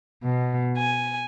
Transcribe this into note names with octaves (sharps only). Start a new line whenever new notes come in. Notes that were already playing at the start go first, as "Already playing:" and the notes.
B2
G#5